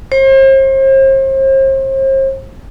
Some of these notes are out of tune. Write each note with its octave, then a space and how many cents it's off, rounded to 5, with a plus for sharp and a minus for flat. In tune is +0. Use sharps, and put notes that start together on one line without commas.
C5 +40